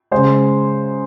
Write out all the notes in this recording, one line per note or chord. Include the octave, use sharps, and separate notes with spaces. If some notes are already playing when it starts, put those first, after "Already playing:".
C#3 G#3 C5